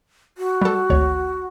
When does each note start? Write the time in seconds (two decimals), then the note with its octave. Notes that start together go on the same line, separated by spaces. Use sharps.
0.38 F#4
0.61 G3 A4
0.90 G#1 D2 C#5